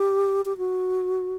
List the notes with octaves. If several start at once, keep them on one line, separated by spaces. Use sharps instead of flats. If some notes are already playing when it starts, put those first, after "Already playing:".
Already playing: G4
G4
F#4